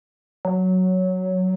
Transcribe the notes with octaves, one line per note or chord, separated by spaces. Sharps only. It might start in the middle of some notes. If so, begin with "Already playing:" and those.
F#3